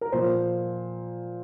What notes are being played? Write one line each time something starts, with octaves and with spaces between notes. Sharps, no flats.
A#4
A#2 F3 C5